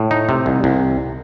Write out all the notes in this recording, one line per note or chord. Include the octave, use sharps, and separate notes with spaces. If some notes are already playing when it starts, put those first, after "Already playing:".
Already playing: A2
D#4
C3
C2
C2